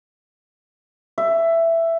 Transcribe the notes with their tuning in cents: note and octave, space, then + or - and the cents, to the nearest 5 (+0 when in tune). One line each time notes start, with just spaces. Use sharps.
E5 +10